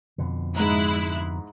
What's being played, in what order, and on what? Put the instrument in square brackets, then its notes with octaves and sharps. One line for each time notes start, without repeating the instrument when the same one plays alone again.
[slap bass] F2 B2 D3
[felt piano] G#2 A#5 [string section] G#3 E4 F#6